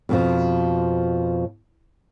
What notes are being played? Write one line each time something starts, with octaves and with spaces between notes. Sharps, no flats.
F2 B2 F3